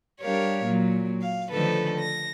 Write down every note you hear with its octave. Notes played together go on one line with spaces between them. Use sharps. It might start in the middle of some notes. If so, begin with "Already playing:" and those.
G3 D4 G4 A#4 C#5 F5
A#2 F#3 A#3
F5
D3 D#3 F3 A3 A4 B4
A#6